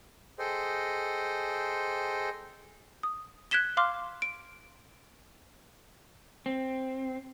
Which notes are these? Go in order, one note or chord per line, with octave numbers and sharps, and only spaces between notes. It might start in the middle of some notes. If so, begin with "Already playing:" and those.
G#4 A4 C5 D#5 G5
D#6
F#6 G#6 B6 E7 G7
F5 C6 D6 F6
D7
C4